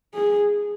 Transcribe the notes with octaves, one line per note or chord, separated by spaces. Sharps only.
G#4